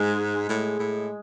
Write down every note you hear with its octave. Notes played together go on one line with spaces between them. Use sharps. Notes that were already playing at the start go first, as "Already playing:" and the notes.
Already playing: G#2 G#3
A2
A2